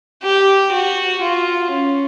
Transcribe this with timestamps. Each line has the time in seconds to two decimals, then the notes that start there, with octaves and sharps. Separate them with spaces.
0.23 G4
0.72 F#4
1.21 F4
1.70 C#4